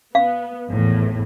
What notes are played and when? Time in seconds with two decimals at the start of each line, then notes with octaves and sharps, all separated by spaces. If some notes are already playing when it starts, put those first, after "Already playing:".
0.15 B3 F5
0.70 G#1 E2 A2